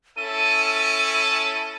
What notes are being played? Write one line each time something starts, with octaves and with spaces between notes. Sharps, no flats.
C#4 E4 A4 D#7